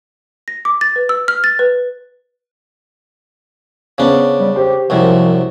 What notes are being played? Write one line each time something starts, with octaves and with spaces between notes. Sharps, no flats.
A#6
D6
A6
B4
E6
F6
A6
B4
C#3 B3 C#4 D4 C5
G3
G4 C5
C2 F#2 C3 F3